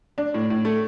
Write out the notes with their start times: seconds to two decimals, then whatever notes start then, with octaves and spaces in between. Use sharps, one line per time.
0.18 D4
0.34 A2
0.50 A2
0.65 A3